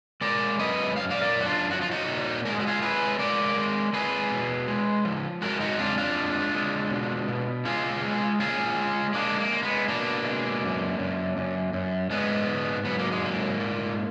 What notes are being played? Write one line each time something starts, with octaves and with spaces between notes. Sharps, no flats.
G#3 A#4 D5
F#2 B4 D#5
F#2 F5
D5 F5
A#4 D5
F#2
F#4
D4 F4
F3 F#4
F4
D#4 F#4
A#2
G#3 A#4
G#4
F#4
F4 G#4
G#3 G#4 B4
G#3 A#4 D5
G#3
G#3 G#4 B4
B2
G#3
F3
G#3 F#4 A#4
D#4 F#4
F2 D4 F4
D4 F4
G#3
G#3
B2
B2
G#3 F4 G#4
G#3
A#2 F4 G#4
G#3
G#3 A#3 D4
A#3
G#3
G#3 B3
B2 A#3 D4
G#3
F#2
F#2
F#2
F#2
G#2 G#3 B3
G#2
F#3 B3
A#3
G#3
G#2 A#3
A#2